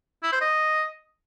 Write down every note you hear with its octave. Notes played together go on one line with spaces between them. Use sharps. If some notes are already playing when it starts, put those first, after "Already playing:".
E4
C5
D#5